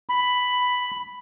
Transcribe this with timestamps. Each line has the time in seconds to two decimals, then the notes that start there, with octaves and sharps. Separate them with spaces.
0.09 B5